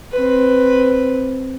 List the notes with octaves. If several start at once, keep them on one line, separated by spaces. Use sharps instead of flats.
C4 B4